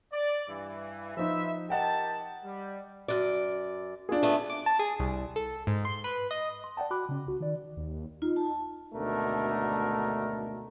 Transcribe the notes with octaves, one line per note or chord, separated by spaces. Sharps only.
D5
G2 E3
F3 D#4 B4 C5 E5
G4 A#4 D#5 F#5 G5 A5
G3
F#2 D5
D4 F4 G#4
A3 B3
D6
A5
G#4
C2
A4
G#2
C6
B4
D#5
C6
D5 F#5 G5 A5
F#4 B5 D6 F#6
C#3 C#4
C2 F#4
D#3 D5
D#2
D#4 F4
A5
G#1 D2 B2 A3 D4 A#4